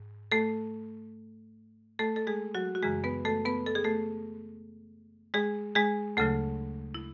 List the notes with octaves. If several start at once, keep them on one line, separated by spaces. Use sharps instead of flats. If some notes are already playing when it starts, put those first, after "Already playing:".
Already playing: G#2
A3 A4
A3 A4
A4
G#3 G#4
F#3 F#4
F#4
F#2 C#3 E3 G#3 G#4
B3 B4
A3 A4
B3 B4
A4
G#4
A3 A4
G#3 G#4
G#3 G#4
D2 C#3 F#3 A3 A4
E4